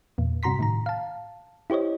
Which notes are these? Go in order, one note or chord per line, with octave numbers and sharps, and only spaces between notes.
E2 A#2
G2 C3 F#4 A#5 C6 B6
A2 D#3 A#5
F5 A5
E4 G4 C5 C#5 D#5